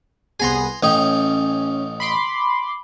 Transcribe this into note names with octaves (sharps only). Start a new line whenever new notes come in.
C2 B3 G#4 G#5 A#5 C6
A1 C#4 D#4 G5
B5 C6 D6